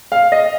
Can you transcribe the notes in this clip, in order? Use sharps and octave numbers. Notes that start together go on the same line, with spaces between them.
F5
D#5